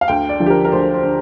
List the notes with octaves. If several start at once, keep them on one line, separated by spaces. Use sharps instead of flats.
F5
D2 G5
D5
D3 F3
G4
A#4
A#4
D2 C5
C5
D3